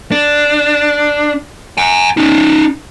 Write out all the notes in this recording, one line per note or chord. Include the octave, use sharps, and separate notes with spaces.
D4
F#5 G#5
C#4 D#4